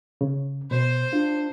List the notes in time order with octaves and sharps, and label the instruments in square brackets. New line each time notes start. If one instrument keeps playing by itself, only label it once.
[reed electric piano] C#3
[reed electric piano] B2 [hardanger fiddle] C5
[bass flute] D4 [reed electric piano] F4